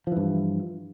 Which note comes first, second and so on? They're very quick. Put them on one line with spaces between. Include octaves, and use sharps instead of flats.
F3 E3 G2